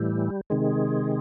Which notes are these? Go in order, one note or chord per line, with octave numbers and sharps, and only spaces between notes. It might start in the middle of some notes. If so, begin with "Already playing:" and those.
Already playing: A2 E3 G3
C3 D#3 G#3